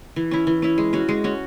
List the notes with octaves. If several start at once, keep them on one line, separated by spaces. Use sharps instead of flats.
E3
C#4 E4
E3
C#4 E4
G#3
C#4 F#4
G#3
C#4 F#4